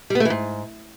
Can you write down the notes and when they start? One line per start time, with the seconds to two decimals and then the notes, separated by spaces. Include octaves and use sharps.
0.10 G3
0.15 B3
0.20 A3
0.25 E3
0.30 G#2